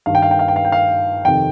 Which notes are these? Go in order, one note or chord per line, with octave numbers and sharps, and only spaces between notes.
G2 D#3 F5
G5
F5
G5
F5
G5
F5
G5
F5
F2 C3 D#3 G5